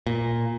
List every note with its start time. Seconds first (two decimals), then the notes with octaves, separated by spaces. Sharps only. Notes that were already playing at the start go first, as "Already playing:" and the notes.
0.07 A#2